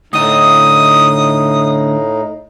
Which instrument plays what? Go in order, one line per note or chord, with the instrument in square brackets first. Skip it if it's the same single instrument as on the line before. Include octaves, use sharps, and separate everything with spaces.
[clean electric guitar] D2 D#5 [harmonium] A2 D#4 [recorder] D#6